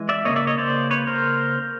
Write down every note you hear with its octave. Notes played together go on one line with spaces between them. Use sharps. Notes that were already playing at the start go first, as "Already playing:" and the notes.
Already playing: E3 G#3
D5 E5
C#3 F3 A#3 C#5 D#5
D5 E5
C#5 D#5
C5 D5
B4 C#5
A#4 C5